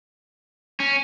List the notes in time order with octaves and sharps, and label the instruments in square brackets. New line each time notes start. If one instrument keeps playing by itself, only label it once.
[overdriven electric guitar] C#4